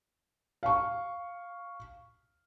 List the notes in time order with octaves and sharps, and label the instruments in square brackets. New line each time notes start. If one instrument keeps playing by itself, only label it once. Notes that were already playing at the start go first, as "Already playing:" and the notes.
[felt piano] F5 C#6